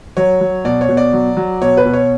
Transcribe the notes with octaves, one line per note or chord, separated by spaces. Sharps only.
F#3 C#5
F#3
B2 D5
C#5
B2
D5
F#3
F#3
B2 C#5
B4
B2
C#5